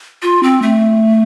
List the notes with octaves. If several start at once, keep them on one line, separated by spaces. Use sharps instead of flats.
F4
C4
A3